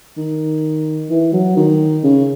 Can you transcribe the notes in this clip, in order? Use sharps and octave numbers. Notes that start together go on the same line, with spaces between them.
D#3
E3
F#3
D#3
C#3